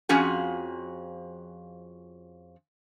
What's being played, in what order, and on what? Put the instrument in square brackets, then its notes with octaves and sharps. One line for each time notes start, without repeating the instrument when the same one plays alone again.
[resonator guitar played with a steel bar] F2 F3 C#4 F#4 G#4